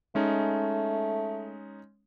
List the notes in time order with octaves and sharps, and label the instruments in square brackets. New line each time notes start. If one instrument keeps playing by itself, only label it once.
[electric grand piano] G#3 C#4 D#4 [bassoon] A3